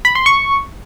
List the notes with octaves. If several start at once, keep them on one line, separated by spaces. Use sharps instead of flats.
B5
C6
C#6